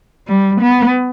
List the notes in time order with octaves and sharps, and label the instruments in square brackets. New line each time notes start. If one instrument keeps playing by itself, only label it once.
[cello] G3
B3